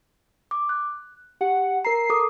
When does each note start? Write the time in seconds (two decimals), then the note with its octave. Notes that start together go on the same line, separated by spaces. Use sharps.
0.51 D6
0.69 F#6
1.41 G4 F#5
1.85 A#4 A#5 C7
2.10 A4 D6 D#6